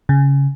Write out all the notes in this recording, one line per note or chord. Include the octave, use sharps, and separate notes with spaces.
C#3